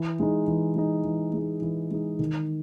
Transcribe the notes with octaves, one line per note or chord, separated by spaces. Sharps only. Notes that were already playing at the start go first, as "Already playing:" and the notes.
Already playing: E3
G#3 D#4
E3
G#3 D#4
E3
G#3 D#4
E3
G#3 D#4
D#3